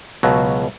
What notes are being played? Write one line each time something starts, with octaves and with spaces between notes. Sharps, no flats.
C#2 B2 F#3